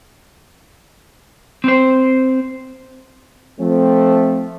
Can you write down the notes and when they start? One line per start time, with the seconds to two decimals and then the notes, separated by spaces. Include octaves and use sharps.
1.64 C4 C5
3.59 F3 A3 C4